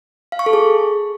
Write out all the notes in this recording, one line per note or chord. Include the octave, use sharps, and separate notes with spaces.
F5
C#6
A4
G#4